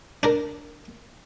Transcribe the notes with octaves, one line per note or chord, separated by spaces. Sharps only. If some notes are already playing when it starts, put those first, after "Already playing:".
D4 A#4